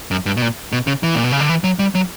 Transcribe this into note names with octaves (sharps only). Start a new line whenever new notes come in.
F#2
G2
B2
A#2
B2
C#3
E3
A#2
B2
C#3
D3
E3
F#3
G3
F#3